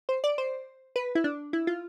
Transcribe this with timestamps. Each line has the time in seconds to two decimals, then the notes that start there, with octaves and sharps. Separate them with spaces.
0.09 C5
0.24 D5
0.38 C5
0.96 B4
1.15 E4
1.24 D4
1.53 E4
1.67 F4